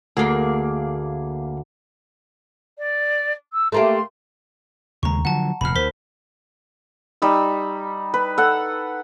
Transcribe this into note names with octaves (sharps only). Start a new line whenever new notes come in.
D2 A#3 G#4
D5
E6
A3 A#3 G4 C6
D#2 C#3 G#3 A#5 C#6
D3 F3 F#3 F#5 A5
F1 D#2 A#2 B5 F6
D2 A#4 C5 B6
G3 D#4 E6
B4
A4 F#5